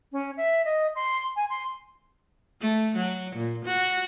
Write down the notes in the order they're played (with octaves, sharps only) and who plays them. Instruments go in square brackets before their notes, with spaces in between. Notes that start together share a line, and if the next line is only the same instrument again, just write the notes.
[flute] C#4
E5
D#5
C6
G#5
C6
[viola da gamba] A3
F#3
A#2
F#4